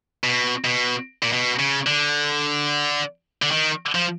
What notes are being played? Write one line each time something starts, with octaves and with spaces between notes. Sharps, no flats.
B2
B2
A#2
B2
C#3
D3
D3
D#3
F3